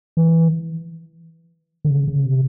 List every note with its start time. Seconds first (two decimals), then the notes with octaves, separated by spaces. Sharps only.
0.17 E3
1.85 D3
1.91 C#3
2.08 C#3
2.25 C3